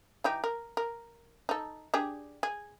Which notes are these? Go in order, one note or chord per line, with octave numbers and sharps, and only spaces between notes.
E3 D#4 G4
A#4
A#4
D#4 A4
D4 G4 G#4
G#4